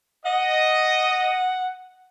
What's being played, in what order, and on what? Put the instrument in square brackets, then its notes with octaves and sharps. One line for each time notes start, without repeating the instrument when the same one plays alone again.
[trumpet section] D#5 [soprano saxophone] F#5